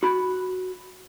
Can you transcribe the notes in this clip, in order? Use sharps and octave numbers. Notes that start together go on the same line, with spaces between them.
F#4 B5